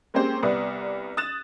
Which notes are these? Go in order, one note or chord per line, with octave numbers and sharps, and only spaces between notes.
G#3 A#3 C4 C#4 G4 C5
C2 B3 B4 D5 D#6
D#6 F#6 A6 E7